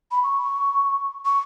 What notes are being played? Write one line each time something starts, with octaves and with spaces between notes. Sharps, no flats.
B5
C#6
C#6